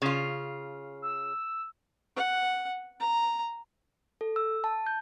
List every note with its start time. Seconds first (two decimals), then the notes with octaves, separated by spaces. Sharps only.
0.02 C#3 F4
1.02 E6
2.16 F#5
3.00 A#5
4.21 A4
4.36 E6
4.64 A5
4.87 G6